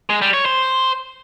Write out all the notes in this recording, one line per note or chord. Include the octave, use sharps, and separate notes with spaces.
G#3
G3
C#5
C5